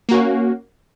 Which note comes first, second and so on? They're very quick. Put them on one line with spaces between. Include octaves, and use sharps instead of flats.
A#3 F#4 C#4